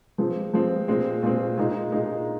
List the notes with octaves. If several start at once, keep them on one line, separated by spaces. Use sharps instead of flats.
F3 G#3 C4
F3 G#3 C4
A#2 G#3 C4
A#2 G#3 C4
A#2 G#3 D#4
A#2 G#3 D#4